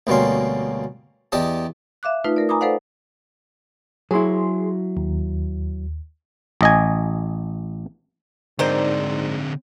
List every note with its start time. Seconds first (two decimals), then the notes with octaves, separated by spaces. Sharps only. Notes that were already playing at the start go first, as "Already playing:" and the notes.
0.07 D2 B2 G3 A#3 C#4 C6
1.32 E2 G4 D5 D#5 A5
2.03 E5 F5 D6 F#6
2.24 A3 D#4 F4 B4
2.36 A3 A#4 D5
2.49 G#5 A#5 B5 D6 D#6
2.61 A4 B4 C5 D5 F5 F#5
4.11 F#3 E4 G#4 C6
4.97 D#2
6.61 A1 D#5 G#5
8.59 G#2 D3 D#3 C4 D#4 C5 D5